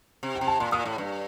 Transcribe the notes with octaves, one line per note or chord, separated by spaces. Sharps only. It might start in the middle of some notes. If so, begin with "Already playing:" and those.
C3
G5
C3
A5
A#2 C6
A#2 D#6
A2
G2